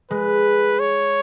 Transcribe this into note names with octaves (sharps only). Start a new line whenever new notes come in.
G#3 B4
C#5